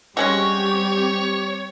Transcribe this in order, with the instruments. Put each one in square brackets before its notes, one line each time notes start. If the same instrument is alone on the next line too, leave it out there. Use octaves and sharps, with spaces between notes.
[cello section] G3 C4 [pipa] G#3 C#4 F#4 [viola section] G4 [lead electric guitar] C#5